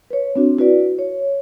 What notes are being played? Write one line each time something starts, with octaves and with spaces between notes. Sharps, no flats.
B4 C#5
C4 D4 F#4
E4 F#4 B4 D5
C#5